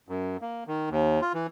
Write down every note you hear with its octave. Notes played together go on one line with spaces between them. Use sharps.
F#2
A#3
D#3
D#2
F4
E3